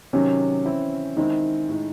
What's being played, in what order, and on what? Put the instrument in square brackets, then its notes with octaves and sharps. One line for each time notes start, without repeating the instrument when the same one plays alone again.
[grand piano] C3 D#3 F#3 [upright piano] C#4
[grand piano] E3 C4 E4
[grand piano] D#3 G#3 C4 E4 [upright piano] D#4
[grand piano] A2 G#3 D#4